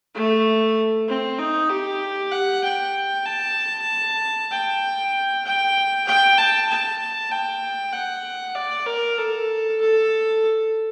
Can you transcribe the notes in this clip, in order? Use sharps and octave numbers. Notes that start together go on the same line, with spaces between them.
A3
C4
D#4
G4
F#5
G5
A5
G5
G5
G5
A5
A5
G5
F#5
D5
A#4
A4
A4